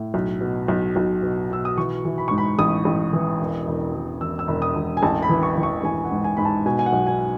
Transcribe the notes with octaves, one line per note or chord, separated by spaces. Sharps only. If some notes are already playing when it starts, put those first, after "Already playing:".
Already playing: A2
B1
B2
B1
B1
B2
B2 E6
D#6
E3 C#6
E3
B5
G#2 C#6
B5
A1 D#6
A1
E3
E1
E1
E1
E1 E6
E6
E1
D#6
E1
G#5
A1 A5
B5
E3
C#6
E3
C#6
A1 G#5
F#5
G#2
G#5
G#2 B5
A5
B2 G#5
G#5
F#5
B1
G#5